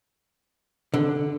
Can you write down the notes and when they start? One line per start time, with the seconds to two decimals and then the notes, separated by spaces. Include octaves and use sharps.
0.94 D3